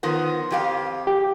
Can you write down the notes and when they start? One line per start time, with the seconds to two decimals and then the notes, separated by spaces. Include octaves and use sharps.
0.03 D#3 F3 B3
0.51 F2 G4 F5
1.07 G4